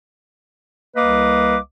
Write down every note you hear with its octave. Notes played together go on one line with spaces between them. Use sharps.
C2 A#3 B4 D#5 F5 D6